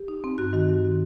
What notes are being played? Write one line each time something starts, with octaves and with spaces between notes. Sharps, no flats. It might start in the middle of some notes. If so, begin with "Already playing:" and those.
Already playing: G4
D#4
C4
G2 F#4
D#3 F#4
G2